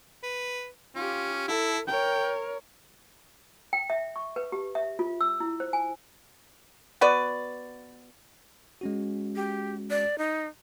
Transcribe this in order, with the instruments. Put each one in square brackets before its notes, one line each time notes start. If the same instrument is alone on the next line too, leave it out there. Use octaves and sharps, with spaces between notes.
[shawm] B4
[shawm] C#4 [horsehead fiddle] F4 G4
[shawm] E4 [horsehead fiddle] A4
[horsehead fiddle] A#4 C#5 [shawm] G5
[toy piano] G5
E5
C#6
B4
G4
E5
F4
E6
E4
C5
G#5
[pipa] B3 F#4 B4 D5
[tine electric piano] G#3 C#4 F#4
[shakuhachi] G4
D5
D#4